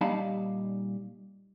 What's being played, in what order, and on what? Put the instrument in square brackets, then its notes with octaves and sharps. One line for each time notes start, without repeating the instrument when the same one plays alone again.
[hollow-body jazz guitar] A#2 G3 D#4 F5 A5 B5